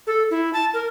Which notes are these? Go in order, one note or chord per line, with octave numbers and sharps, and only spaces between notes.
A4
E4
A5
A#4